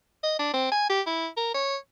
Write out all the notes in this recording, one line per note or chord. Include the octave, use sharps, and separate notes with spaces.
D#5
D4
C4
G#5
G4
E4
A#4
C#5